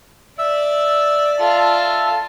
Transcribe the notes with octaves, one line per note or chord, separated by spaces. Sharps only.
D5 E5 E6
F4 A4 E5 A5